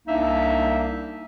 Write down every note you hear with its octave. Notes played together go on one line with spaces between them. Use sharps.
C2 A#3 D4 D#4 E5